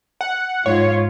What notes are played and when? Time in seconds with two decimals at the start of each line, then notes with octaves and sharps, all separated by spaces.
0.21 F#5
0.66 G#2 F4 C#5